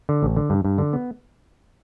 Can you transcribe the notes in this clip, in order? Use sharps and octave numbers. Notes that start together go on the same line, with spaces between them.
D3
A1
D3
G2
G2
D3
B3